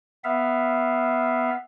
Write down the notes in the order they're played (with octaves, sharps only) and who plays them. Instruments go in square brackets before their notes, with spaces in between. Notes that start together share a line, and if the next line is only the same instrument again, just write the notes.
[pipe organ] B3 E5 F5